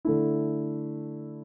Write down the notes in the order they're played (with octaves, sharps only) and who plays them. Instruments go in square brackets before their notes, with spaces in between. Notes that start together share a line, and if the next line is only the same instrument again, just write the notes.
[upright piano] D3 A3 E4